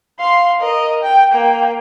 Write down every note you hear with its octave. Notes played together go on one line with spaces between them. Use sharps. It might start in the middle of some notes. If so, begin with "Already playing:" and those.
F5 C6
A#4 D#5
G5
A#3 G5